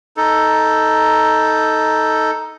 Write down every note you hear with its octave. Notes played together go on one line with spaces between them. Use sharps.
D#4 A4